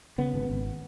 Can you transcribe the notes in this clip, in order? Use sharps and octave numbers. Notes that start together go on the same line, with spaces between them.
C#3 B3
G#1
G#1